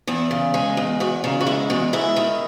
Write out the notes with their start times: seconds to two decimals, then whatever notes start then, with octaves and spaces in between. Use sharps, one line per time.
0.07 E2 E4
0.31 C#3
0.54 G#3 G#4
0.77 E2
1.00 E2 F#4
1.24 C#3 D#4
1.41 F#4
1.47 G#3 E4
1.70 E2 F#4
1.93 G#2 E4
2.16 D#3